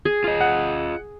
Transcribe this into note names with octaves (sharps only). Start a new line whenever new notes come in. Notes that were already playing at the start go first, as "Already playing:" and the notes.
G#4
F4 D#5
F#5